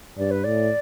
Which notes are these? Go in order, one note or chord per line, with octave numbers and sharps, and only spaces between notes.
G2 D5
B4
A2 D5